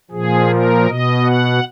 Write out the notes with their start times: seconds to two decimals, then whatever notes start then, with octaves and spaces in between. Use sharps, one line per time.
0.11 A#2 F3 G#4
0.50 A#4
0.87 B2 D#5
1.25 F#5